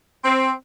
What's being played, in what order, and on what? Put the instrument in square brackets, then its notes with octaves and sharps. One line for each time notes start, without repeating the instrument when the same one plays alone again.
[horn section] C4